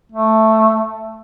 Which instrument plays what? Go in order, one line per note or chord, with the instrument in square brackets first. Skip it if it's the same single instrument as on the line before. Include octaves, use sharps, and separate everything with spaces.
[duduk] A3